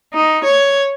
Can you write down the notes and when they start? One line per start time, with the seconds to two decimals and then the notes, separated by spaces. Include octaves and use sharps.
0.14 D#4
0.44 C#5